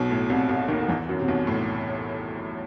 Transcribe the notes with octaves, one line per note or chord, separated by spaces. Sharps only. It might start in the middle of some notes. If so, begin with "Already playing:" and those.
Already playing: B1 B2
A2
C2 C3
C2 C3
D#2 D#3
E2 E3
F#2 F#3
C3
B1 B2
A2